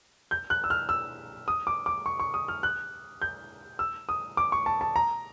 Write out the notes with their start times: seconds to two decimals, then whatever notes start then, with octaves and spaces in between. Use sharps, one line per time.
0.31 G6
0.50 F#6
0.64 E6
0.70 F6
0.89 E6
1.48 D#6
1.67 D6
1.86 D6
2.06 C#6
2.20 C#6
2.34 D#6
2.48 F6
2.63 F#6
3.22 G6
3.79 E6
4.09 D#6
4.37 D6
4.52 C#6
4.66 A5
4.81 A5
4.96 A#5